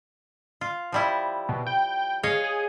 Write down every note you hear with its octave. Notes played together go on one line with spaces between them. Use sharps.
F4
F3 G3 E4
B2
G5
G#4 C#5 D#5 F5
G#4